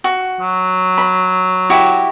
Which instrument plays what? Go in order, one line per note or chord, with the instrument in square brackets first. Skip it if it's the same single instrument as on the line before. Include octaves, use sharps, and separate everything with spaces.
[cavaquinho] F#4
[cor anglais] F#3
[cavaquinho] B5
E4 F#4 G4